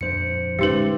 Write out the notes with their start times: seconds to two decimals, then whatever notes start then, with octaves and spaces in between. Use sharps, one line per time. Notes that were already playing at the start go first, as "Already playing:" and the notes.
0.01 F2 D4 C5 C#7
0.59 D1 G#3 C#4 D#4 G4 B4